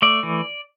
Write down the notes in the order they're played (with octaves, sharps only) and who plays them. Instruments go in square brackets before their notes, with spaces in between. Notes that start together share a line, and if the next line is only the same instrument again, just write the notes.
[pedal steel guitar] A3 D5
E3